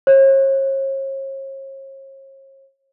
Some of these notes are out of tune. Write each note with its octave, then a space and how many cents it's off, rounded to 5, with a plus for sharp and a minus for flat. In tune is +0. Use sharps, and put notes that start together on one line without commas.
C#5 -45